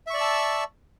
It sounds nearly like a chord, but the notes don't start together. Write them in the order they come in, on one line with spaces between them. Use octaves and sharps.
E5 C#6 D5 E6 A5